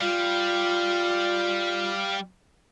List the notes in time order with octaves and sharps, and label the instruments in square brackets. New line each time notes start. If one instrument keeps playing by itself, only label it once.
[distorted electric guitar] G3 [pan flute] F4 [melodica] F5